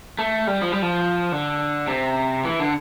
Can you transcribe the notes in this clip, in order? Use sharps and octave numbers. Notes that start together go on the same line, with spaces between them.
A3
G3
F3
G3
F3
D3
C3
E3
D3